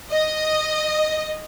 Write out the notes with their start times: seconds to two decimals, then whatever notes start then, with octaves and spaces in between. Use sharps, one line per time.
0.11 D#5